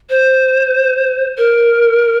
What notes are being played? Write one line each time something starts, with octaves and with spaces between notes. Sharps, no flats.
C5
A#4